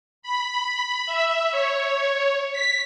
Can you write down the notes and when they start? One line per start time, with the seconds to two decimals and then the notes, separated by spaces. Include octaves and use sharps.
0.22 B5
1.06 E5
1.51 C#5
2.52 B6